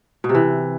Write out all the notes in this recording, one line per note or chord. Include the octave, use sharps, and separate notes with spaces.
B2
C3
E3